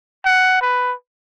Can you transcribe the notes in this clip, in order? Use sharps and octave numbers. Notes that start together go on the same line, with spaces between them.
F#5
B4